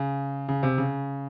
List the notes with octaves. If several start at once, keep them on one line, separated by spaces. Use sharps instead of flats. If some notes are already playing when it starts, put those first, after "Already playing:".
Already playing: C#3
C#3
C3
C#3